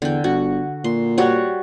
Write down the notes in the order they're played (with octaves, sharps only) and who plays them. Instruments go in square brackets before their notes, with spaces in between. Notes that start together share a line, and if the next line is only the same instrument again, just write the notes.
[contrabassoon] E2 [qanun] D3 G5
[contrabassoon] G1 [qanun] F#4
[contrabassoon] A#2 [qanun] C6
[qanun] G3 F#4 C#5